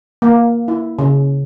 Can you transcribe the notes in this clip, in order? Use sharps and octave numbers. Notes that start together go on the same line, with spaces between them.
A#3
E4
C#3